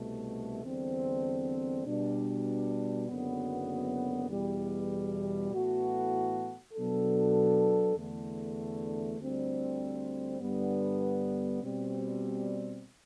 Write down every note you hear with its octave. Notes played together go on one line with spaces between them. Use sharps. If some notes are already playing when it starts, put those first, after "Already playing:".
Already playing: C2 B2 A3
E2 D3 G3 C4
B2 G3 D4
F#1 F#2 D3 F#3 B3
E2 B2 G3
A2 E3 B3 F#4 A4
B2 F#3 B3 D4 A4
E2 D3 A3
D2 D3 G3 C4
G2 D3 G3 B3
B2 G3 C4